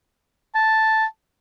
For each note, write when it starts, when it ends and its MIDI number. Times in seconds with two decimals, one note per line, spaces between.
0.55 1.05 81